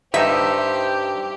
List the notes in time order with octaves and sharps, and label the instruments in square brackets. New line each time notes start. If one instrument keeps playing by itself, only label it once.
[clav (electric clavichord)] G2 D#4 [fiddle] G4 [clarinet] C5 [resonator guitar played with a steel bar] E5